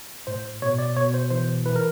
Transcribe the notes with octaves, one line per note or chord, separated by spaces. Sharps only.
A2 C5
B2 C#5
D5
B2 C#5
C5
E3 C5
E3 B4
A#4